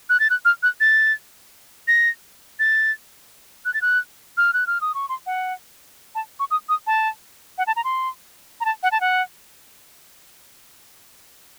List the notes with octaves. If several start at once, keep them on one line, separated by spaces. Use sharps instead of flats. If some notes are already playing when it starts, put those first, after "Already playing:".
F#6
A6
F#6
F6
F#6
A6
A#6
A6
F#6
A6
F#6
F6
F#6
F6
D#6
C#6
C6
F#5
A5
C#6
D#6
D#6
A5
F#5
A5
A#5
C6
A#5
A5
F#5
A5
F#5